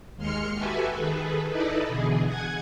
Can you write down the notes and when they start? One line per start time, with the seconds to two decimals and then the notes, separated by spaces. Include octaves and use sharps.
0.16 D#2 G#3 C6 F6 C#7
0.54 F#4 G4 A4 B4 E5 G#5
0.95 D#3 G#4 A4 B4
1.48 D#4 E4 A4 B4 D5 D#5
1.87 B2 D3 E3 G#4
2.26 F#5 G#5 G#6